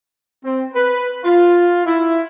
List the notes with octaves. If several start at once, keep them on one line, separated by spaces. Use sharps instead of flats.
C4
B4
F4
E4